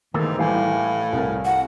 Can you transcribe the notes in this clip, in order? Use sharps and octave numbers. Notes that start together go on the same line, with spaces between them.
G#2 D#3 E3 A3 A#3
A2 E3 G3 G4 F5 G#5
C2 A#4
F#5